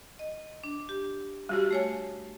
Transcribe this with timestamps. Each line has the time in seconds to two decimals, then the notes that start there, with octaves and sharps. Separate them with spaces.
0.19 D#5
0.64 D4
0.89 G4
1.49 G3 F#4 G4
1.71 A3 C#5 G#5